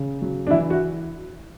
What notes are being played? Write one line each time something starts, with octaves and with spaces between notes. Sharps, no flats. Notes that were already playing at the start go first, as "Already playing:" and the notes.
Already playing: C#3
F#3
D4
E3 E4
F#4